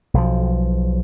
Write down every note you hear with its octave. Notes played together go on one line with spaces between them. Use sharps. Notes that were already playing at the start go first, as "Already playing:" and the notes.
B1 F3